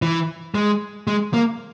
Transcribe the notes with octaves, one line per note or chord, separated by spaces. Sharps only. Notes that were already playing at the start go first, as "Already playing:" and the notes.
E3
G#3
G#3
A#3